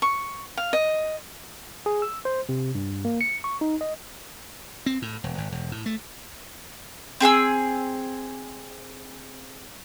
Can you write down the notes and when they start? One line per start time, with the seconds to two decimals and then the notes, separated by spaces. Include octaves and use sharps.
0.02 C#6
0.57 F5
0.73 D#5
1.86 G#4
2.02 E6
2.25 C5
2.49 C3
2.75 G2
3.05 A#3
3.21 C#7
3.44 C#6
3.61 D#4
3.81 D#5
4.86 C4
5.02 A2
5.24 E1
5.38 G#1
5.52 E1
5.72 A2
5.86 A3
7.20 C4 G#4 G#5 E6